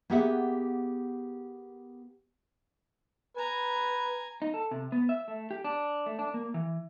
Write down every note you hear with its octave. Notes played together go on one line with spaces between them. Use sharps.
A#3 B3 G4 G#4 E5 F#5
B4 G#5 A#5
D#4
A4
C3
B3
E5
A3
G4
D4
A3
D4
A#3
E3